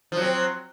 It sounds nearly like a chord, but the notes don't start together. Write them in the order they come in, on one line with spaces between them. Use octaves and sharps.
F3 F#3 C4